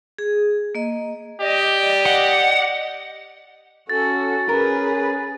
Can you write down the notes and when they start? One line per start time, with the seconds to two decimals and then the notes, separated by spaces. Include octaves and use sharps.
0.18 G#4
0.75 A#3 D#5
1.41 G4 D5 D#5
2.06 F#5
3.89 C#4 F#4 A4 A6
4.49 C#4 G#4 A#4 B4